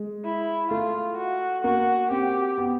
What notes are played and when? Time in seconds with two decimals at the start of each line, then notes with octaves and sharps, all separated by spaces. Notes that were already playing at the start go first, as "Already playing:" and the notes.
Already playing: G#3
0.24 E4
0.71 A3 F4
1.17 F#4
1.64 A#3 F#4
2.11 C4 G4
2.58 B3